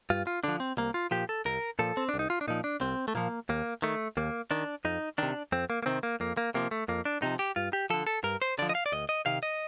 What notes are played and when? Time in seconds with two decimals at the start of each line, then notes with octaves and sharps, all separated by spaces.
0.10 G2 F4
0.27 F4
0.44 D3 F3 D4
0.60 C4
0.77 C2 A#3
0.94 F4
1.11 A#2 F3 G4
1.29 A4
1.45 C2 A#4
1.79 A#2 F3 A4
1.97 C4
2.09 D4
2.14 C2
2.19 D#4
2.30 F4
2.41 D4
2.48 A#2 F3 D#4
2.64 D4
2.81 C2 C4
3.08 A3
3.15 A#2 F3 A#3
3.49 D#2 A#3
3.82 D#3 A3
4.17 D#2 A#3
4.51 D#3 D4
4.85 F2 D#4
5.18 C3 D#3 D4
5.52 F2 C4
5.70 A#3
5.83 A#3
5.86 C3 D#3 C4
6.03 A#3
6.20 F2 A#3
6.37 A#3
6.54 C3 F3 A#3
6.71 A3
6.88 F2 A#3
7.05 D4
7.22 C3 F3 D#4
7.39 G4
7.56 G2 F4
7.73 G4
7.90 D3 F3 A4
8.07 A4
8.23 G2 A#4
8.42 C5
8.59 D3 F3 D5
8.69 D#5
8.75 F5
8.86 D5
8.92 D2 D#5
9.09 D#5
9.26 C3 D#3 F5
9.43 D#5